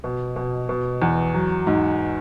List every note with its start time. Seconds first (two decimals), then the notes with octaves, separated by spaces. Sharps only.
0.04 B2
0.36 B2
0.69 B2
1.02 E2
1.34 F#3
1.67 G#2